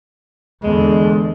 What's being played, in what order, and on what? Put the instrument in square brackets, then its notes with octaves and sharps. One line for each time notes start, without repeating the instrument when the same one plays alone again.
[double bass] E2 D3 [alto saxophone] G#3